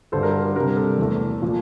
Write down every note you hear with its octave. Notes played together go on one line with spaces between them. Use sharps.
G2 D3 G3 A4 C5
A#4 D5
A#4
C3 G3 D4 A#4
A4 C5
E2 E3 A3
A#2 F3